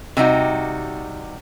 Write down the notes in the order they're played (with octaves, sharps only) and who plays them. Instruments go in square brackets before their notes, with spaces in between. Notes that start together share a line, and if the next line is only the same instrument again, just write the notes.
[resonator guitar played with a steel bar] C3 G3 D#4 F#4